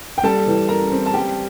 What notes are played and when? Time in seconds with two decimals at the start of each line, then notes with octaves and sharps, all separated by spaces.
0.18 G5
0.23 G3 A4 A5
0.47 E3
0.69 E3 A#4 A#5
0.92 C4
1.06 A5
1.14 G3 G4 G5